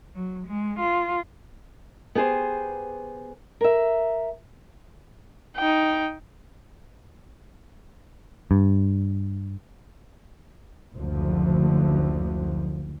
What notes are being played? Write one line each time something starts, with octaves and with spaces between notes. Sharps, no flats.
F#3
G#3
F4
B3 G4 G#4 C5
A#4 E5
D#4 G5
G2
F#1 D2 F3